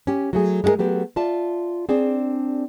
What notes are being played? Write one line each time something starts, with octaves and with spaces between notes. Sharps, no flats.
C#4 G4
F#3 A3 G#4
G#3 A3 F#4 G#4 A#4
F#3 A3 B3 G4
F4 D5 E5 A5
C4 D4 G#4 D5